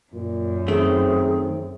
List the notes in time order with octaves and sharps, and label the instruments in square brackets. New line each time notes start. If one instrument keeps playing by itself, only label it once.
[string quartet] F#2 [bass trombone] A#2
[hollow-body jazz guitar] D#3 A3 [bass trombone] C4 [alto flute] G#4